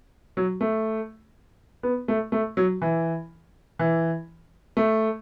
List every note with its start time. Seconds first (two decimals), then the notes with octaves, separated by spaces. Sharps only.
0.37 F#3
0.61 A3
1.83 B3
2.08 A3
2.32 A3
2.57 F#3
2.82 E3
3.79 E3
4.77 A3